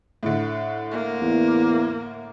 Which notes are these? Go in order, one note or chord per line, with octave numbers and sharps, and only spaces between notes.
A2 D3
A#3
E2